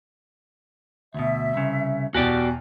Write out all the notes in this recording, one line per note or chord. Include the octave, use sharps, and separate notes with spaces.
D2 B2 E5
C2 C#3
E2 B2 F#4 G4 D5